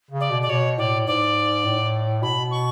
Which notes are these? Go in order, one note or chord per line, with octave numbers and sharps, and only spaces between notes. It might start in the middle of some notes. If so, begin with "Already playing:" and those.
C#3
D5
B2
D5
B2 C#5
A2 D5
G#2 D5
A2
B2 B5
C#6